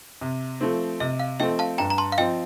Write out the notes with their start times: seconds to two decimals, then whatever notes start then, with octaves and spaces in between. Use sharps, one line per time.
0.21 C3
0.61 F3 A3 C4
1.00 C3 D#5
1.20 F5
1.40 F3 A3 C4 D#5 G5
1.59 F5 A5
1.78 G2 G5 A#5
1.90 A#5
1.98 A5 C6
2.12 F5
2.18 F3 C4 D#5 G5